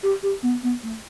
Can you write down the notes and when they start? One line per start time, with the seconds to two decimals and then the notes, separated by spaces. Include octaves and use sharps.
0.03 G4
0.22 G4
0.42 B3
0.63 B3
0.83 A3